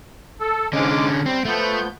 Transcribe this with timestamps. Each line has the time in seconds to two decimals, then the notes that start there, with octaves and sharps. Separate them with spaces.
0.40 A4
0.73 G#2 D3 G#3 C#4 D6
1.26 G3 C4
1.45 F3 A3 B3 G6